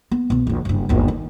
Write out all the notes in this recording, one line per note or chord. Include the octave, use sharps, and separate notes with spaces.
B3
C2 B2
A#1 E2
F#1 G2
G1 D#2
D#3